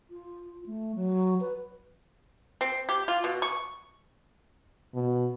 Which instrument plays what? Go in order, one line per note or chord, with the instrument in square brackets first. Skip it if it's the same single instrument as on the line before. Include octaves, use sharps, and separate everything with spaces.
[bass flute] F4
A3
F#3
B4
[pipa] C4
G4
F4
B2
C#6
[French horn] B2